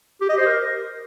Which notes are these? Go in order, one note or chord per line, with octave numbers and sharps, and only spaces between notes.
G4
D#5
C5
A#4